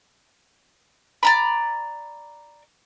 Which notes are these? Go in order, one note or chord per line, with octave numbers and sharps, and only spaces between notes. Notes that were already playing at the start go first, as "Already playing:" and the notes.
D5 A#5 B5